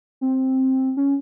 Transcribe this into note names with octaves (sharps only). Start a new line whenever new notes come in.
C4
C#4